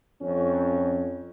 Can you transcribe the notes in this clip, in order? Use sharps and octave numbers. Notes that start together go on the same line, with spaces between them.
F2 C#4